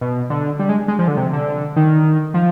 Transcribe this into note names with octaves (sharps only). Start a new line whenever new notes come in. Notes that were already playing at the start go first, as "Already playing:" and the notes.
B2
D3
G3
G#3
G#3
F3
D3
C3
D3
D#3
F3